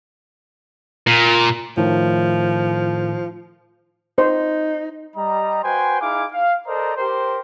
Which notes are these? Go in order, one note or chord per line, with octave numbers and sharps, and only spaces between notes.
A#2
A2 D#3 F3
D#4 C5
G3 D#5 A#5
F#4 B4 C5 G5 G#5 C6
D#4 E4 G#4 F5 G#5 D6
F5
A4 A#4 C5 D5 D#5 A#5
G4 A#4 C5